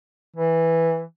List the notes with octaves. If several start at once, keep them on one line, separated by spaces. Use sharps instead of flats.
E3